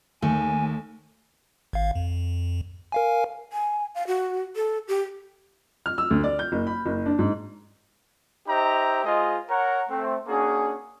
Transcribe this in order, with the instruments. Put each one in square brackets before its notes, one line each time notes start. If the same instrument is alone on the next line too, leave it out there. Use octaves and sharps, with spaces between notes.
[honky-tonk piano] D#2 [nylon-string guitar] A3 [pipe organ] G#5
[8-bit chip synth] G#1 F5
F2
A#4 F5 G#5
[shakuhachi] G#5
F5
F#4
A4
G4
[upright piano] F6
E6
D2
D5
G6
F#1
B5
F#1
D4
G#2
[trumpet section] D#4 G4 C5 D#5 E5 A#5
G#3 F4 G#4 C5 D#5
A#4 C#5 F#5 A#5
A3 C4
A#3 C#4 D4 F#4 G#4